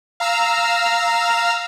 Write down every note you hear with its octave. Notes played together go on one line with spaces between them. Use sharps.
F5 A#5 E6 F6